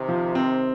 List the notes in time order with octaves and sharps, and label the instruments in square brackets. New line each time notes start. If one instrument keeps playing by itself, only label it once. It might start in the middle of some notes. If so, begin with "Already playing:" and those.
Already playing: [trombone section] C3 D#3
[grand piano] F3
C4